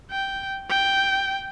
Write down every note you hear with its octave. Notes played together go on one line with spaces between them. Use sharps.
G5
G5